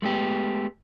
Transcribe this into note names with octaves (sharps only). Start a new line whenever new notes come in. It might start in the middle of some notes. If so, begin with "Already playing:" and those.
G#3 A3 B3 G4